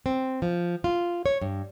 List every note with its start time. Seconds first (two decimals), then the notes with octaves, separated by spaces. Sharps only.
0.06 C4
0.42 F3
0.84 F4
1.26 C#5
1.42 G2